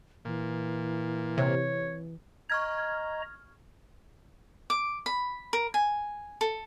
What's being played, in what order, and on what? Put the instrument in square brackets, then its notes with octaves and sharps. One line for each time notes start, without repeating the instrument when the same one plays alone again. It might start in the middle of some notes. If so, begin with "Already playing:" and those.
[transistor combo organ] A#2 [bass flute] E3
[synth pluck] C3 [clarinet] C#5
[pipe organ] D#5 A#5 [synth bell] C#6 F6 G#6
[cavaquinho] D6
B5
A#4
G#5
A4